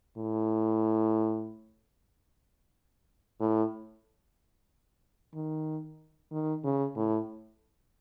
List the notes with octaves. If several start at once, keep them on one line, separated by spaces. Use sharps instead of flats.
A2
A2
D#3
D#3
C#3
A2